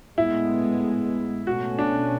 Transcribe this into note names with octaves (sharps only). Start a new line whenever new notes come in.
A2 G#3 B3 E4
B2 A3 C#4 F#4
D4